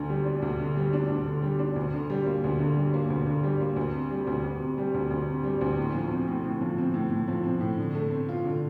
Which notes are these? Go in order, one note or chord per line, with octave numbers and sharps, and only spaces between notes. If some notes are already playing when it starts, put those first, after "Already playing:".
Already playing: D2 D3
G3
D4
D2
D3
G3
D4
D2
D3
G3
D4
D2
D3
G3
A#3
D2
D3
G3
A#3
D2
D3
G3
A#3
D2
C3
G3
D2
D2
C3
G3
D2
D2
C3
G3
D2
A2
F3
C4
A2
A2
F3
C4
A2
A2
F3
C4
A2
D3
A3
C4
F4
D3